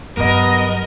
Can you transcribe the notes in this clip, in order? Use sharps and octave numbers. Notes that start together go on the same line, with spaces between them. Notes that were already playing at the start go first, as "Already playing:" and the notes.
G2 F#3 B3 A#4 D#5